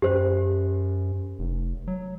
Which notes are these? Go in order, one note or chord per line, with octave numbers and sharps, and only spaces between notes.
F#2 G4 C5
F1
F#3